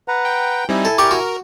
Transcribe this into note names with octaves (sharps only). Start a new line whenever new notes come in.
B4 F#5 A#5
G5
G3 C4 D#4 E4 G#5
A4
G4 A#4 D5 C#6
F#4